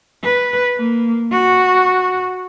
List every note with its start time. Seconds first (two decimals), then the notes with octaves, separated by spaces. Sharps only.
0.24 B4
0.78 A#3
1.32 F#4